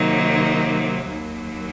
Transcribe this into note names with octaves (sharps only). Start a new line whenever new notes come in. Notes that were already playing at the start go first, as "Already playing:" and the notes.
Already playing: C3 D#3 F#3 A#3 D#4
D#2 D#3 F#3 A#3